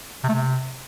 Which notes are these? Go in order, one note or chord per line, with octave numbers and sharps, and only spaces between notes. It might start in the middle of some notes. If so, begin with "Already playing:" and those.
C3
A3
C3